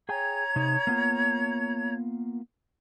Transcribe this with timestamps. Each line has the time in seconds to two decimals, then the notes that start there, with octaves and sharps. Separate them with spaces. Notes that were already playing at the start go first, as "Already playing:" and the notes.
0.09 G#4 C#5 G5 G#5 A#5 G#6
0.56 C3 D#4
0.87 A#3 B3 F4